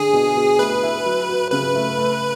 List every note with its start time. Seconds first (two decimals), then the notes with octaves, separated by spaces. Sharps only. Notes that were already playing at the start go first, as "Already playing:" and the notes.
Already playing: D3 G#4
0.13 B2
0.37 B2
0.59 A3 B4
0.83 E4
1.05 F#3
1.29 F#3
1.51 C#3 B4
1.75 A3
1.98 A3